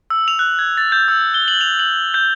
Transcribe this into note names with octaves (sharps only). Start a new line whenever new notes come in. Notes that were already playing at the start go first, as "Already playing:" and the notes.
E6
F7
F#6
G#6
A6
G6
E6
G7
F#7
F7
F#7
G6